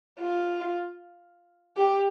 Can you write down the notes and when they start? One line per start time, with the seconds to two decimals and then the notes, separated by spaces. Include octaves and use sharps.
0.20 F4
1.77 G4